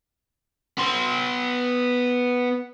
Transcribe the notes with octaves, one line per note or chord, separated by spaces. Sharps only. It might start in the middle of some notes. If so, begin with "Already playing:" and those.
B3 C6